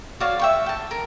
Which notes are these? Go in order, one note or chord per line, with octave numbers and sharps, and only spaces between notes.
F#4 C#5 D5 F5
E5 G5 C#6
G5 A5
A#4